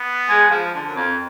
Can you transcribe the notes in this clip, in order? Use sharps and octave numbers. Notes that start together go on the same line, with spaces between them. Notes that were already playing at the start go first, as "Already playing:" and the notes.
Already playing: B3
G#3
F3
D3
F#2
F2